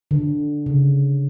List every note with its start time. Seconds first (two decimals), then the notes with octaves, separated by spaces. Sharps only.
0.11 D3
0.66 C#3